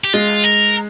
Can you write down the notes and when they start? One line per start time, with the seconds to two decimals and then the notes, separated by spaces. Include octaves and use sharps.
0.04 G4
0.13 G#3 F4
0.44 A#4